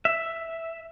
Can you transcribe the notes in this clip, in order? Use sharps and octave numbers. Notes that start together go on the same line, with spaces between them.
E5